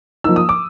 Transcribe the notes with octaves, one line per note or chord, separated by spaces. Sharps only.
F3 A#3 D#4 E6
D#6
D6